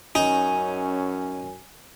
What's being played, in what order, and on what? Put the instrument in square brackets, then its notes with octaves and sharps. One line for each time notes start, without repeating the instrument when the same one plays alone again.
[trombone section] F#2 C#4 [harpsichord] D#4 [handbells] G#5